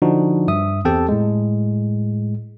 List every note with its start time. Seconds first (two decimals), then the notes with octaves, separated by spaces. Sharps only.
0.02 D3 F3 D4 D#4 F#4
0.48 G2 E5 D#6
0.85 E2 C4 G4 A4 G5 A5
1.09 A2 G#3